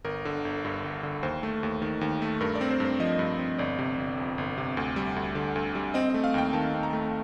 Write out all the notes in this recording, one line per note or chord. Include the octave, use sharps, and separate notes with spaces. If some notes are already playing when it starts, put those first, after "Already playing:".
G1 A#4
D3
G1
G2
G1
D3
D#2 C5
A3
D#2
D#3
D#2
A3
G2 A#4
D5
C4
C5
G2
C5
F3 D#5
G2
C4
G1 D5
C3
G1
F2
G1
C3
D2
G3
D2
D3
D2
G3
C4 D#5
A3 D#5
F5
D#2 G5
D#3 A5
C4
A#5
A3